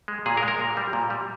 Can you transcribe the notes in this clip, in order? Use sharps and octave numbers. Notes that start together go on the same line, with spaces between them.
G#3
A#2 G#4
A#4
G#3
A#4
A#2
G3
A#2
G3